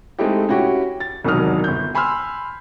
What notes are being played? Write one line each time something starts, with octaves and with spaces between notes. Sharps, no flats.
G#3 A3 C4 D#4 E4 G4
C#4 E4 F#4 G4
A6
E1 C2 D#3 F#3 D#6 F6
G1 G6
G#5 B5 C6 E6 F6